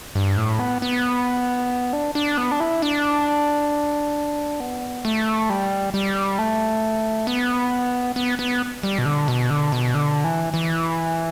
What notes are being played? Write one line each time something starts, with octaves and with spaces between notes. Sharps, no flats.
G2
A2
B3
B3
D4
D4
B3
D4
E4
D4
B3
A3
G3
G3
A3
B3
B3
B3
G3
B2
D3
B2
D3
B2
D3
E3
E3